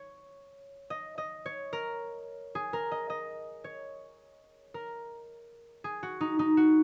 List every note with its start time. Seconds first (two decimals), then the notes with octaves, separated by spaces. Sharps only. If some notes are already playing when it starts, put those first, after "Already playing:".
Already playing: C#5
0.90 D#5
1.18 D#5
1.46 C#5
1.73 A#4
2.55 G#4
2.73 A#4
2.91 D#5
3.10 D#5
3.64 C#5
4.74 A#4
5.84 G#4
6.03 F#4
6.21 D#4
6.39 D#4
6.57 F#4